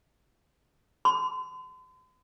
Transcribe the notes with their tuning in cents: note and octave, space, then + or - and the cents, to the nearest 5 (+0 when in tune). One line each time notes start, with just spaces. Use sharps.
C6 -45